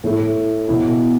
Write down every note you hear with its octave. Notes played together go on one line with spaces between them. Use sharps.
A2 A3 E4
B2 B3 E4